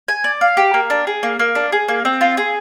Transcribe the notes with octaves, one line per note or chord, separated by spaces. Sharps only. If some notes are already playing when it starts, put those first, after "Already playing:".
G#5
D5
F5
G4
A#3
D4
G#4
A#3
A#3
D4
G#4
A#3
C4
F4
G#4